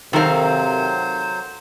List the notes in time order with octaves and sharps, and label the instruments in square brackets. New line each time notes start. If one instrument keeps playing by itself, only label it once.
[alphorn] C3 [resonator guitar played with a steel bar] D#3 C4 [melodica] F#3 C5 [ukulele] A4 A#4 F5